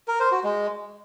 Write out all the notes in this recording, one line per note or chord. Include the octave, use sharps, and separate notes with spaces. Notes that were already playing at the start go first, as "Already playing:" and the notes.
A#4
C5
F#4
G#3